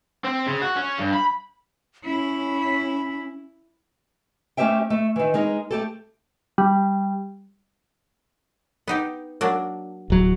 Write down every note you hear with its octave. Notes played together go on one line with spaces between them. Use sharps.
C4
C#3
F#4
C#4
G2
B5
C#4 E4
A3 C#4 G4 C5 E5 G5
A3
D#3 E3
G#3 D#4 A#4
A3 G4 A4
G3
B3 D#4 G4
F#3 A#3 D4
D1 F#3